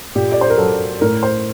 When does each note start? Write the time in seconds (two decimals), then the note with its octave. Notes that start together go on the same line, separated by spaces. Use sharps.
0.15 A#2 G4
0.32 D5
0.41 C5
0.50 A#4
0.58 F#3 A4
1.01 A2 A#4
1.23 C5